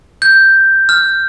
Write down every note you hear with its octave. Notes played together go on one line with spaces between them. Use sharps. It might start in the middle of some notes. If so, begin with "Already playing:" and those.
G6
F6